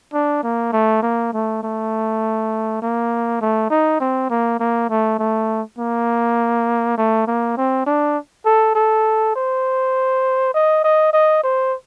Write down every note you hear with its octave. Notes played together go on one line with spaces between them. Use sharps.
D4
A#3
A3
A#3
A3
A3
A#3
A3
D#4
C4
A#3
A#3
A3
A3
A#3
A3
A#3
C4
D4
A4
A4
C5
D#5
D#5
D#5
C5